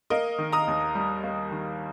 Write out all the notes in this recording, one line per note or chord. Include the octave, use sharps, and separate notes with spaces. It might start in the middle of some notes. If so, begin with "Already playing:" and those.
A#3 A#4 D#5
D#3
A#5 D#6
D#2
G3
A#3
D#3